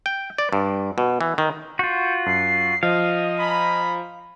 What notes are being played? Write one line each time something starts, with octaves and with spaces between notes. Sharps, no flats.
G5
D5
G2
B2
E3
D#3
F4 F#4 G6
F#2 C7
F3 D#5 F5
G#5 A#5 B5